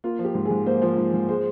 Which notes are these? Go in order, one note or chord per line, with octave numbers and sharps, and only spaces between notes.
A#3 F4
F3
G4
G#2
G#2 G#4
A#3 C5
F3
G#2
G#2
G#3 C5